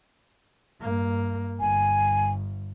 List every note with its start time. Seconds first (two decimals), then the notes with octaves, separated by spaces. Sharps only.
0.80 G2 A#3
1.60 G1 G#5